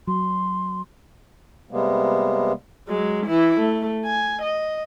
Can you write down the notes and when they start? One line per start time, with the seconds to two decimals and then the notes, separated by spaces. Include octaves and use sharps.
0.08 F#3 C6
1.71 C3 G3 G#3 A#3 B3
2.87 F#3 G#3
3.26 E3 E4
3.60 A3
4.05 G#5
4.42 D#5